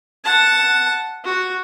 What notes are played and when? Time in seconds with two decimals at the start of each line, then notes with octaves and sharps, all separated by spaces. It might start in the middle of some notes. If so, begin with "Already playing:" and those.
0.24 F#5 A5
1.24 F#4